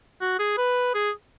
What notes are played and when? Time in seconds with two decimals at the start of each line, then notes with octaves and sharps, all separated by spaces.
0.21 F#4
0.39 G#4
0.58 B4
0.94 G#4